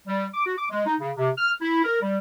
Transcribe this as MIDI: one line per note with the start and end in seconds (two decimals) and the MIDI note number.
0.07 0.25 55
0.34 0.44 86
0.46 0.55 66
0.58 0.69 86
0.71 0.82 56
0.86 0.95 63
1.01 1.11 49
1.17 1.30 48
1.38 1.52 89
1.61 1.83 64
1.84 2.00 70
2.01 2.18 55